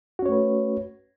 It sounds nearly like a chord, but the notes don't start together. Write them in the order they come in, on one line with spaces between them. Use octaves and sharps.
F#4 C#4 C#5 A3 B4